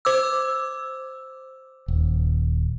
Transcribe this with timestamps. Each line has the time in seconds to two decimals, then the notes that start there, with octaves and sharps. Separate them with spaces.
0.05 C5 D6 E6
1.88 D#1